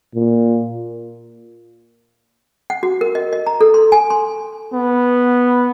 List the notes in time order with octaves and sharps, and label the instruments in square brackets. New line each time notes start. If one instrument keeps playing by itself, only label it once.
[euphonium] A#2
[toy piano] F#5
F#4
A#4
D#5
D#5
A#5
A4
C6
G#5
C6
[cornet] B3